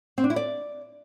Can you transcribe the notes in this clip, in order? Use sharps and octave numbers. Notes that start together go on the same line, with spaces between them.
C4
D4
E4
D5